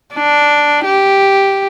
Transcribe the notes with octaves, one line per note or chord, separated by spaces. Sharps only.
D4
G4